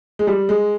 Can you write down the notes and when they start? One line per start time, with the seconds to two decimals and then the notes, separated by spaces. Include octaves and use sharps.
0.19 G#3
0.27 G3
0.49 G#3